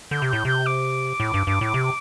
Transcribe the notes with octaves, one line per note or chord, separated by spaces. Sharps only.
D3 G6
C3
A2 G6
C3 G6
D6
A2
G2
G2
A2
C3